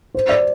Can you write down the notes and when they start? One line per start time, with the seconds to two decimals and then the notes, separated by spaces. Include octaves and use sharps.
0.15 C5
0.29 D5